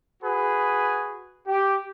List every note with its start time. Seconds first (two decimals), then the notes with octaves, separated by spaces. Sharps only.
0.23 F#4 G#4 B4
1.47 G4